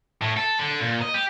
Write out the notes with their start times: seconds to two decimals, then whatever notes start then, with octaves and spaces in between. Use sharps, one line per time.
0.22 A2
0.37 A4
0.59 D3
0.81 A#2
1.02 D#5
1.14 G4